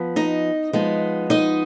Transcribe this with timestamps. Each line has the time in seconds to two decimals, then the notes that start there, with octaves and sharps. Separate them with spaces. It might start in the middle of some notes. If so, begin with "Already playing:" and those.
Already playing: F3 B3
0.16 D#4 D#5
0.73 F3 G#3 B3 D#4
1.30 D#4 D#5